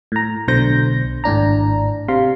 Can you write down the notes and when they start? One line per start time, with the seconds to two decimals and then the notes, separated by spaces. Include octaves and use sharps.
0.12 A2 A#5
0.48 B1 B2 D3 C5 G6 A#6
1.24 G#1 A2 D4 A#5
2.08 C3 F5 C6